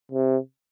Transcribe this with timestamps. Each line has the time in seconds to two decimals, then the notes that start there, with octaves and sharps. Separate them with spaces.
0.12 C3